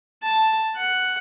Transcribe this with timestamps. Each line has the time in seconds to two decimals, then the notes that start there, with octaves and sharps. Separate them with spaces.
0.23 A5
0.76 F#5